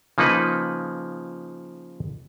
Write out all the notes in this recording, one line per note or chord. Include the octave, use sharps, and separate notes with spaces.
C#3 F3 A#3 D#4 B4